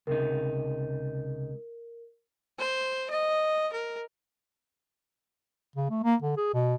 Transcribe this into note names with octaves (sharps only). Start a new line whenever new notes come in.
C#2 C3 D#4 A#4
C5
D#5
A#4
C#3
A3
A#3
D3
G#4
B2